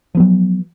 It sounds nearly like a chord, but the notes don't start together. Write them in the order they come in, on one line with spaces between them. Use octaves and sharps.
F3 B3 F#3